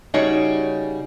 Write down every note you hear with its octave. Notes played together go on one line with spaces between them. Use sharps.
C#3 G3 D#4 F#4 C#5